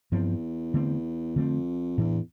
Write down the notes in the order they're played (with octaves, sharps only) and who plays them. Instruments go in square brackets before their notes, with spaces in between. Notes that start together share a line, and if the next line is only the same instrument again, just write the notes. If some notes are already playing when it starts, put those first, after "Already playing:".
[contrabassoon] E2 [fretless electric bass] G2 F3 C4
[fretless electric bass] D3 A3 C4
[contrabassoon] F2 [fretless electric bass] D3 A3 C4
[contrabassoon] E2 [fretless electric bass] A2 E3 B3 D4